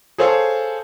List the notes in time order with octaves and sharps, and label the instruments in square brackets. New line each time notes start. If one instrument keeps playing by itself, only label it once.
[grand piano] G#4 A4 C5 C#5 F5 A5